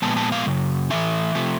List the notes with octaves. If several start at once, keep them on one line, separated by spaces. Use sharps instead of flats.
A#2 F3 G#3 B3 A5
A5
F5
F#2 C#3
A2 E3 A3 C#4 E5
C3 F3 A3